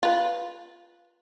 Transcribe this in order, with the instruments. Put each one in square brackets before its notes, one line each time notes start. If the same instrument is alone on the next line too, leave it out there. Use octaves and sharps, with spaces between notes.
[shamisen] F4 B4